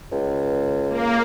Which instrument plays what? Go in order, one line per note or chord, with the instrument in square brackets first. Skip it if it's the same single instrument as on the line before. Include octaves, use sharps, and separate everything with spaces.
[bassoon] C#2
[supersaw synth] A#3